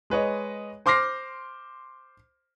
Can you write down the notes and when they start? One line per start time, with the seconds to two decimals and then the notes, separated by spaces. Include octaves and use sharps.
0.10 G#3 B4 C#5 D#5
0.86 C5 C6 D6 F6 A#6 C7